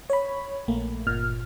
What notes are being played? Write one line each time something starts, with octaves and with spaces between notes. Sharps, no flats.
C#5 B5
A#1 A3 A#3
G1 A#2 F6